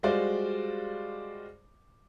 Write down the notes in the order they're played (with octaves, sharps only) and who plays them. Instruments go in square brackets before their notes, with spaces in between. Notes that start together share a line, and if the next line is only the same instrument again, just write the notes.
[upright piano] G3 G#3 F4 F#4 C5 D5